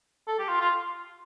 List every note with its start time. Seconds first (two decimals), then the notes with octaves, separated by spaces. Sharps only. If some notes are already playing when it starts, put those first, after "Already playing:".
0.28 A4
0.39 G4
0.48 F4
0.60 F4